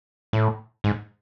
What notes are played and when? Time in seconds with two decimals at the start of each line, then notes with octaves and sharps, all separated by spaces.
0.33 A2
0.84 G#2